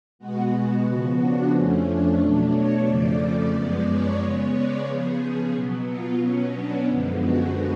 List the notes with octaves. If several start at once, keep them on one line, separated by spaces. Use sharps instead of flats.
B2 G#3 B3 F#4
C#3 F3 B3
D4
F2 F3 A3 C#4
D4
B2 F#3 A3
C#5
F2 C#3 F3 A3 D5
F#2 F3 G#3 B3
C#5
C#3 G#3 B3 C#5
D5
C#3 F3 B3 G#4
B2 F#3 B3
F4
B2 F#3 B3 C#4
D4
F#2 D3 F3 G#3 B3
F#4